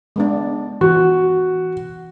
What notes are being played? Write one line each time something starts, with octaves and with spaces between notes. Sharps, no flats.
G#3 B3 D4
E3 F#4